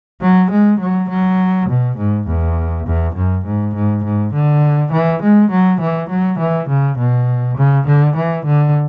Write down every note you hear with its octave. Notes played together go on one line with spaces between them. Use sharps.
F#3
G#3
F#3
F#3
B2
G#2
E2
E2
F#2
G#2
G#2
G#2
D3
E3
G#3
F#3
E3
F#3
E3
C#3
B2
C#3
D3
E3
D3